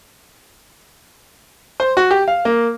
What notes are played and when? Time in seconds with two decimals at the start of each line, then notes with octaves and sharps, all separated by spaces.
1.80 C5
1.97 F#4
2.11 G4
2.28 F5
2.45 A#3